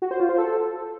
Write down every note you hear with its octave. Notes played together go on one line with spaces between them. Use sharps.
F#4
C5
F4
C5
A4